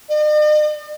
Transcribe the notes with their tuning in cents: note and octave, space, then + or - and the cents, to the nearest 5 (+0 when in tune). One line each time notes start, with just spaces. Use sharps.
D#5 -45